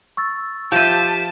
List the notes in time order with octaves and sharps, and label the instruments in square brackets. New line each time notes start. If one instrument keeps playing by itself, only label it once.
[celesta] C#6 E6 A6
[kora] F3 F4 [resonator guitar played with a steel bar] G4 E5 [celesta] F5 D#7 [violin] A5